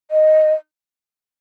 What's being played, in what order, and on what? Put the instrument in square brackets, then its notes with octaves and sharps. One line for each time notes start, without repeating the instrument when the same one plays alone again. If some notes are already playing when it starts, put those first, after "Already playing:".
[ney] D#5